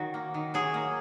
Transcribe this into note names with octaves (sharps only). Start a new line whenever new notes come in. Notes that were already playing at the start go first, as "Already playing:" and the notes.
Already playing: D#3 F#3 F#4
A#3
D#3
F#3 G#4
A#3